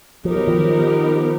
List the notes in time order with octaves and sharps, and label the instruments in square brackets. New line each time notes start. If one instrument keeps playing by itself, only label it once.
[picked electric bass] F3 [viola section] B3 D#4 G4 A#4
[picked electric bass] F#3
D#3 F3